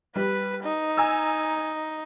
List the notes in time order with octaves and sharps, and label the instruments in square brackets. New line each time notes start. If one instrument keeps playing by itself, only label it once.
[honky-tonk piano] G3 [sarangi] B4
[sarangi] D#4
[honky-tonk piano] G#5 A#5 E6